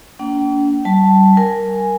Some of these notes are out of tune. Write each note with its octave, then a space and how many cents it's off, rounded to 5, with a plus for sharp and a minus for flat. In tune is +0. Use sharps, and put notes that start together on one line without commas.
A#3 +0 D4 -40 G5 -40
G3 -35 A5 +0
A#4 +0 G#5 +5